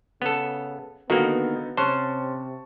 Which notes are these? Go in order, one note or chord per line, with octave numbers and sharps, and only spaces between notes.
C#3 B3 A4
D3 D#3 A#3 B3 D#4 F#4 A4
C3 C#4 C5 A5 C#6 F#6